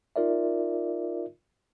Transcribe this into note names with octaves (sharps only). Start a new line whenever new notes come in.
D#4 F4 A#4 D5 E5